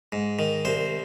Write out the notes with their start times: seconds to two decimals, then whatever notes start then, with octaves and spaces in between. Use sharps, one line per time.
0.12 G#2
0.39 D#3
0.65 C2 C5